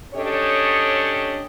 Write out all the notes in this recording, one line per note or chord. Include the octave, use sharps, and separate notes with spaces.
C#4 D4 G4 A4 C#5 D#5